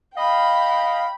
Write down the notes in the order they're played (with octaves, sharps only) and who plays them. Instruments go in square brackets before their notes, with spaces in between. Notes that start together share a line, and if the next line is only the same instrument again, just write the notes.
[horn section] D#5 F5 [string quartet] G5 B5